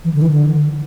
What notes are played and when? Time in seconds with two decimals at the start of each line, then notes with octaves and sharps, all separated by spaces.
0.04 E3
0.14 D3
0.22 E3
0.31 D3